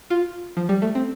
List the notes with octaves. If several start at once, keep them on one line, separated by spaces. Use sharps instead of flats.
F4
F3
G3
A3
C4